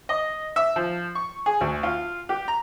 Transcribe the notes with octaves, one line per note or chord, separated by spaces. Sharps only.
D#5
E5
F3
C#6
G#4
D2
F4
G4
A#5